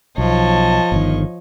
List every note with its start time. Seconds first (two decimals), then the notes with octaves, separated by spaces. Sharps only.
0.18 B1 F3 C#5 D#5 A5
0.92 G1 D#3